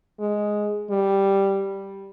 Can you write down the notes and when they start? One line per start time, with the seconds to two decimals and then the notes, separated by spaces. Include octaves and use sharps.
0.20 G#3
0.90 G3